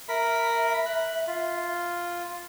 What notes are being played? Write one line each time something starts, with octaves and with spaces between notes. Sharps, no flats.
A#4 E5 B5
F#6
F4